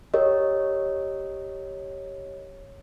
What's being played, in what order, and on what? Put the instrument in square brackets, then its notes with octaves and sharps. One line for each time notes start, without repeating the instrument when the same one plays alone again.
[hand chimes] G4 A#4 C#5 D#5